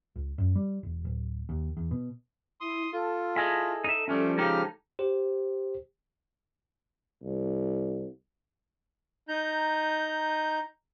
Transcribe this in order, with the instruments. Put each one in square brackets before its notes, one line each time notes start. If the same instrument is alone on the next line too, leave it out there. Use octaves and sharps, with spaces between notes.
[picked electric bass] C#2
F#2
G3
E1
D1
D#2
E2
B2
[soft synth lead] E4 [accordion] C6 D#6
[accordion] F4 [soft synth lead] A4
[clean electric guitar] E4 G#4 D#5 [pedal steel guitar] B5
[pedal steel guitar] D#4 E5
[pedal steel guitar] F3 [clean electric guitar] G3 C#4 [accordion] A3
[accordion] C#3 G4 F6 [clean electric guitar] G#3 D#4 A#5
[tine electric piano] G4 C5
[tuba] C2
[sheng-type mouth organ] D#4 A#5 G6